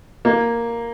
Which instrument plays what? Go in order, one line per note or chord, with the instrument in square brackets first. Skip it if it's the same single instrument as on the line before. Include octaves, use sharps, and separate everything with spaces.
[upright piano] A#3